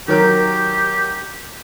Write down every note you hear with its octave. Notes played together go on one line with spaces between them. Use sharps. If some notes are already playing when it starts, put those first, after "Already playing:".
D#3 F#3 G4 A#4